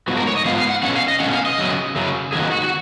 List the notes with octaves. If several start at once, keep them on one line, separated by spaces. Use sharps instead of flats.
G#2 F3 B3 F#4
A#4
C#5
D#5
G#2 F3 B3 F5
F5
F#5
B2 G#3 C#4 F#5
F5
D#5
B2 G#3 C#4 F#5
F5
D#5
F#2 C#3 F#3
F#2 C#3 F#3
F2 D#3 F#3 G#4
F#4
F#4